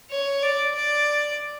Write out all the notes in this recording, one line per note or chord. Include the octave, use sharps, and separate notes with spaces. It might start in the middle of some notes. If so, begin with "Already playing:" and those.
C#5
D5
D5